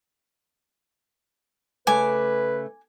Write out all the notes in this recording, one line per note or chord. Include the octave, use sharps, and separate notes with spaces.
C#3 A3 B4 C#5 G#5 D6